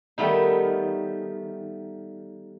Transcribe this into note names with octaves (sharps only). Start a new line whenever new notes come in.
D#3 G3 A3 B3 D#4